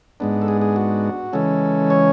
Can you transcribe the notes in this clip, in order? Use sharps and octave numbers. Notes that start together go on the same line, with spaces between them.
G#2 G#3 B3 D4
A4
G#4
G#4
F#4
C#3 E3 G#3 C#4 A4
C#5